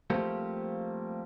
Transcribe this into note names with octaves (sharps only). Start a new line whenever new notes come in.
F3 G3 A3 A#3 C4 G4